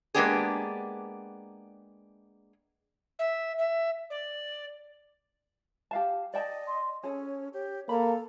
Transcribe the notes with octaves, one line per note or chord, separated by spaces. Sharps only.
G#3 A#3 B3 D4 G4 G#4
E5
E5
D5
G4 F5 A5
D5 D#5 G5 A5
C6
C#4 G#4 A4 C#5
G4 C#5
A#3 A4 A#5 B5